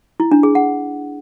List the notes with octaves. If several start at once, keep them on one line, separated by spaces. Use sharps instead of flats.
E4
D4
G#4
F#5